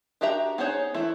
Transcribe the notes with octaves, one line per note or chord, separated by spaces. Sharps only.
D4 F#4 G4 E5 A#5
B3 D#4 G#4 C5 C#5
E3 A3 E4